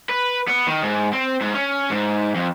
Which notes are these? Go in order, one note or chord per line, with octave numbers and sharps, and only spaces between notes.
B4
B3
D#3
G#2
C4
G#2
C#4
G#2
F2